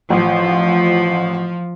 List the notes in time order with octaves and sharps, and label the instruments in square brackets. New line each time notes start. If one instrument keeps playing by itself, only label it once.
[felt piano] A1 [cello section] F3